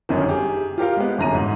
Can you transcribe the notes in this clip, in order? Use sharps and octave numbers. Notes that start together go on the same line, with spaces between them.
G1 F#2 D#3
G4 G#4
F4 G4 A#4 F5
G#3 B3
G1 F#2 A#5 D#7
G#2